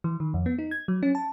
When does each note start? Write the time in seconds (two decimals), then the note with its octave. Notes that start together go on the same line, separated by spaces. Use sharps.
0.04 E3
0.20 D#3
0.34 F2
0.46 B3
0.59 D#4
0.71 G#6
0.88 F#3
1.03 C#4
1.15 A5